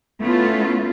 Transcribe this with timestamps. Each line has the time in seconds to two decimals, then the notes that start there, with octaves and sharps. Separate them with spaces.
0.22 A3 B3 C#4 E4 F4